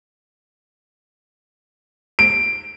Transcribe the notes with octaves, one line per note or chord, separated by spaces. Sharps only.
D7